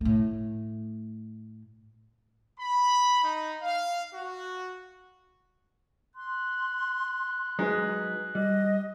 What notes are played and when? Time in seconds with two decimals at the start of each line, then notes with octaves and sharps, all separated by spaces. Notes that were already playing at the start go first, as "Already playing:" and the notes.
0.01 A2 A3
2.60 B5
3.24 D#4
3.62 F5
4.14 F#4
6.16 C6 F#6
7.59 F#3 G#3 D#4 B4
8.35 G3 D#5